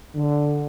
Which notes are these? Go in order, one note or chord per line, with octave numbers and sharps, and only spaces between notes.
D3